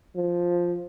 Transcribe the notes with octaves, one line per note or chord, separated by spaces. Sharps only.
F3